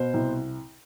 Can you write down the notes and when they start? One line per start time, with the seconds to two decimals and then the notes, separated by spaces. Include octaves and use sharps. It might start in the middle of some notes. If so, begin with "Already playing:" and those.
Already playing: B2 C5
0.14 C2